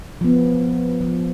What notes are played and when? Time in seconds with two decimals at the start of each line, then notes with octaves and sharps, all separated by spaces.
0.21 F3 B3
1.01 F3